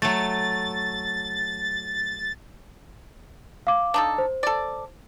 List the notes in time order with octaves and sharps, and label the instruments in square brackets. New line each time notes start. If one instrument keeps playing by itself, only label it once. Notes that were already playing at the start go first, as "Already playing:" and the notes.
[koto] F#3 A3 [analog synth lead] A6
[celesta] F5 D6
[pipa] D4 D#4 A4
[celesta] C5
[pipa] A4 D5